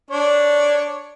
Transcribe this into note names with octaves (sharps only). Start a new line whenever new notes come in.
D4 C#5